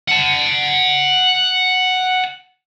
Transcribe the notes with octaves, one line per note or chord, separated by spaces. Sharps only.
F#5 A5